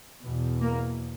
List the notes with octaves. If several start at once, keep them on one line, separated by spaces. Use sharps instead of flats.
E2 B2
A#3